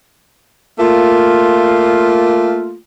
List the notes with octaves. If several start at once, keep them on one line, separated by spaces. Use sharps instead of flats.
A3 A#3 F4